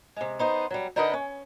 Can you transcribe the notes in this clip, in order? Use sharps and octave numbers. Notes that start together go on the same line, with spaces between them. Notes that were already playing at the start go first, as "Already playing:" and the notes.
C3 G#3
B3 D#4 C5
F#3 G3
D3 D#4 A#4 B4 D#5 F#5
C#4